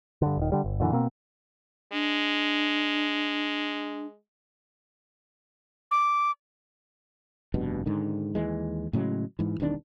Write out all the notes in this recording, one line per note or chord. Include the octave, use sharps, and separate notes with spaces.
G2 D3
D#1 D#3
D3 G3
G1
F#2 A#2 D3 E3
B2 A#3 C4
G#3 D4
D6
F1 G2 B2
G#2 D3 D#3
D#2 E3 G#3
A2 C#3 F#3 G#3
G#2 E3
E1 C2 D#3 D4